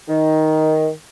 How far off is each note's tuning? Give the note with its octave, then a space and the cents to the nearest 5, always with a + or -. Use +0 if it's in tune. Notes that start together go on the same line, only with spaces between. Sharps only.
D#3 +10